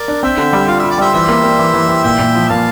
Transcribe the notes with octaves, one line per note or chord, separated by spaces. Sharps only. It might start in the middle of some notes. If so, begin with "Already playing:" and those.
Already playing: A#4 D5
D4
C4 E5 G5
D3
G3
F4 F5
F4 E5
D5
G3 C5 E5
E3 C5 E5
A#3
A#3
E3
E3
E3
A#2 E5 G5
A#2
F3
A#2 F5 A5